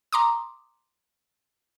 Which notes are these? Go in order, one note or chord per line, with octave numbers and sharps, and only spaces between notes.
A#5 C6 D6 D#6